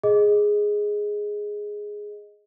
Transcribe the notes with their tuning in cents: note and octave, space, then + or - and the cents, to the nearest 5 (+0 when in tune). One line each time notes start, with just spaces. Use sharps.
G#4 +0 D#5 +0